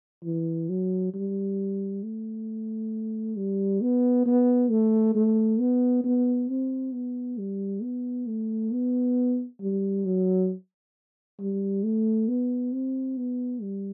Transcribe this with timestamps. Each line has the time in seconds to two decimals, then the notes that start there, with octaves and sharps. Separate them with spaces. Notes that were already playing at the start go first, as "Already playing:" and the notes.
0.24 E3
0.69 F#3
1.14 G3
2.03 A3
3.36 G3
3.81 B3
4.26 B3
4.70 A3
5.15 A3
5.60 B3
6.04 B3
6.49 C4
6.94 B3
7.38 G3
7.82 B3
8.27 A3
8.72 B3
9.61 G3
10.05 F#3
11.39 G3
11.83 A3
12.28 B3
12.73 C4
13.17 B3
13.62 G3